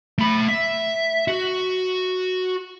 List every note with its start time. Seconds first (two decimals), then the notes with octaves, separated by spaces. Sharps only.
0.18 A3 B5
0.49 E5
1.28 F#4